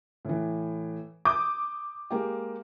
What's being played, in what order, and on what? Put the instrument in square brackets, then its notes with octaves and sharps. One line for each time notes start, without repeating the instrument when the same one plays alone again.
[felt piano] A2 E3
[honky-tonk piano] D6 D#6 [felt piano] G6
[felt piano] G#3 A#3 G4